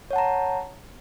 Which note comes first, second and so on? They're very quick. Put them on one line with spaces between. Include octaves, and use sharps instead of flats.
C#5 F#5 A5 A#5